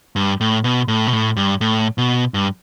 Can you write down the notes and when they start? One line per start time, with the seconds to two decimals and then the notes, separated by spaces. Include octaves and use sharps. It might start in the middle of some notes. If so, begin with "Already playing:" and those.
0.16 G2
0.41 A2
0.64 B2
0.88 A2
1.07 B2
1.13 A2
1.36 G2
1.61 A2
1.98 B2
2.34 G2